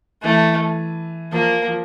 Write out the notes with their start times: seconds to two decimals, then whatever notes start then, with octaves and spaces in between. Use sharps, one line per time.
0.23 E3 A3
1.32 F3 A#3
1.67 F3